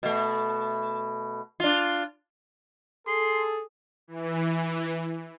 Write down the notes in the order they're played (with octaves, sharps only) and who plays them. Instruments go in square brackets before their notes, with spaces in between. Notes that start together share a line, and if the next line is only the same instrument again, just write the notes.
[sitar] B2 A3
D4 F4
[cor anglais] G#4 [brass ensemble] A4 [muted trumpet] C6
[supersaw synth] E3